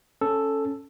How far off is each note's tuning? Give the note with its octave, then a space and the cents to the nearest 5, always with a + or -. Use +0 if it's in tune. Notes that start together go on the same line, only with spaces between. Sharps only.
C#4 +0 A4 +0